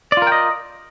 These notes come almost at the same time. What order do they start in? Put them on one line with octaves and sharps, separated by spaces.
D5 F4 A#4 G5 D#5